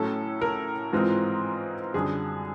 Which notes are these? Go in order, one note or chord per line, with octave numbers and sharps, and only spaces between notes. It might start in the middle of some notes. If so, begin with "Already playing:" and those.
Already playing: A2 F#3 A3 C#4 A4
A#4
G#2 E3 G#3 C4 F4
F#2 D3 G3 G#4